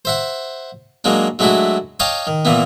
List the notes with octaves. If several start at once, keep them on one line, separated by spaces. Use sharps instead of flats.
C5 E5 F#5
F#3 G#3 A#3 D4
F#3 G#3 A3 D4 E4 F#4
C#5 D#5 F5 G5 A5 D6
D#3
A#2 E3 A#3 B3